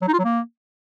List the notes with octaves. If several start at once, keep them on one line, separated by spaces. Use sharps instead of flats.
F#3
D#4
F4
F#3
A#3